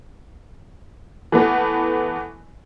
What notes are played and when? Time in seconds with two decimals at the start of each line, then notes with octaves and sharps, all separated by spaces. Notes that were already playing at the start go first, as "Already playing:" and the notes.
1.32 E3 A3 B3